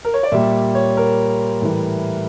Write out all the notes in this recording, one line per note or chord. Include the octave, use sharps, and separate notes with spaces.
A#4
C#5
D5
A#2 G3 E5
C#5
A#4
A2 E3 G3